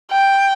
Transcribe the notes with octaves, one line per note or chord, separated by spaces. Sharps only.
G5